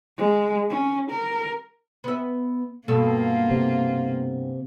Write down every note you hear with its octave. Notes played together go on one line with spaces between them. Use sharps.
G#3
C#4
A#4
B3 E5
G2 B2 A#3 F4 A4
C3